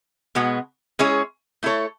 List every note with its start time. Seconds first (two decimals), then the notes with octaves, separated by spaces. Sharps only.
0.35 B2 G#3 B3 F#4
0.99 G#3 C#4 E4 G#4 C#5
1.63 A3 E4 A4 C#5